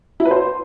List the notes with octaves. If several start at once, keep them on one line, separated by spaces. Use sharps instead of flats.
E4
B4
C5